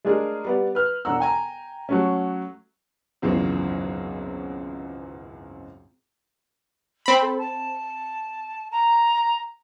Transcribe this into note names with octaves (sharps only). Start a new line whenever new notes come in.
G#3 A3 D4 G#4 A#4
G3 B3 D5
B4 F6
E1 D4 F#5 A#5 E6
G5 G#5 A#5
F#3 A3 C#4
G#1 C#2 F#2 B2 E3 F#3
C4 B5
A4
A5
A#5